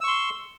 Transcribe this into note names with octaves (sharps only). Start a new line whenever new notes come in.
C6 C#6 E6